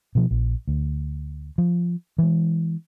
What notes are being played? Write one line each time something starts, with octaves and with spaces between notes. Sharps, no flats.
B2 F3
A#1
D2
F3
E3 G#3